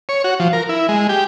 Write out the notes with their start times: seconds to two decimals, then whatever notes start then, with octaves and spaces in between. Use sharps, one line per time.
0.09 C#5
0.24 F#4
0.40 F3
0.53 A#4
0.69 E4
0.89 G#3
1.09 G4